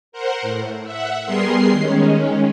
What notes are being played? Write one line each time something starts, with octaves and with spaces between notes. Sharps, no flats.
A#4 C5 F#5
A2
E5 F#5
G3 B3 G#4 A#4 C6 C7
D#3 G#3 C#4